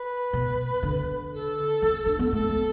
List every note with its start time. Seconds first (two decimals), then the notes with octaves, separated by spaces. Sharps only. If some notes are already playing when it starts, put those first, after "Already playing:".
Already playing: B4
0.33 B2
0.83 D3
1.33 A4
1.82 E3
2.06 D4
2.19 B3
2.33 A3 A4
2.49 B3